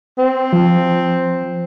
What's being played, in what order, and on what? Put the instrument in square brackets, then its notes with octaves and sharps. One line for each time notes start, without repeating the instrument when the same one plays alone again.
[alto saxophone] C4
[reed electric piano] F3